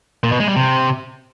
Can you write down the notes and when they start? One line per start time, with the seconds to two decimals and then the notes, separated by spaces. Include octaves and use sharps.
0.24 A#2
0.32 B2
0.40 G#3
0.48 G3
0.56 C3